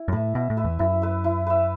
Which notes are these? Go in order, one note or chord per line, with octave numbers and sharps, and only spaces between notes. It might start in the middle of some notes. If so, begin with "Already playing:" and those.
Already playing: E4
F#2
A2 B4 E5
B2 E4
A2
B4 E5
E2
F#2 E4
B4 E5
E4
B4 E5